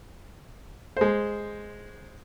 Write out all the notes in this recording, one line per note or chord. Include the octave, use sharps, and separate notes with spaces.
G#3 C5